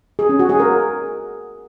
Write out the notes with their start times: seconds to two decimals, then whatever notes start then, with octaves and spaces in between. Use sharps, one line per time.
0.19 G#4
0.29 C#4
0.39 F#4
0.49 G#4
0.60 A#4